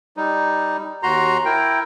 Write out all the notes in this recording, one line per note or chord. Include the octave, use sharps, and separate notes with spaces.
G3 D#4
D#2 F#4 A#5 C6
E4 A#4 G5